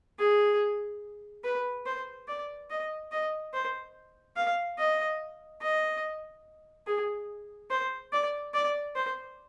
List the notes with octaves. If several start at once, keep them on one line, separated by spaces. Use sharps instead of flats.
G#4
B4
C5
D5
D#5
D#5
C5
F5
D#5
D#5
G#4
C5
D5
D5
C5